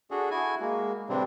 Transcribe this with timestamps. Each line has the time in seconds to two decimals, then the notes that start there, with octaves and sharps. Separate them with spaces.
0.11 D4 F#4 G#4 A4
0.31 E4 F#4 G#5
0.60 G#3 A#3
1.09 A2 C3 E3 G3 C4 D4